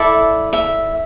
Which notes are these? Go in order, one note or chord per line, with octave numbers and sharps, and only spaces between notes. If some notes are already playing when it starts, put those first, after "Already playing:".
Already playing: E4 A4 D5 E5
E5